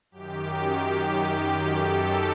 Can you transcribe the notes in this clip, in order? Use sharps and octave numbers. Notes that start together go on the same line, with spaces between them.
F#2 D#3 G4
G4
A4